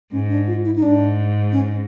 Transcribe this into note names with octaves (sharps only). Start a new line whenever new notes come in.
G#2 C#4
D4
F4
E4
D#4
G#2 D4
C#4